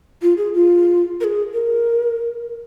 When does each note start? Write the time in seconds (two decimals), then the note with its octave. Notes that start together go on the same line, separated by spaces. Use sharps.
0.22 F4
0.37 G#4
0.55 F4
1.21 A#4
1.24 G#4
1.53 A#4